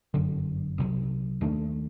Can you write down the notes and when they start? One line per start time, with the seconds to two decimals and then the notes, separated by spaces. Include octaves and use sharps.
0.14 G1 F#2 D3 F#3
0.78 C2 C3 D#3 F#3
1.41 D#2 D#3 A3 D4